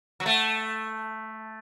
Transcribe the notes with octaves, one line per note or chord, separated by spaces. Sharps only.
F#3
A3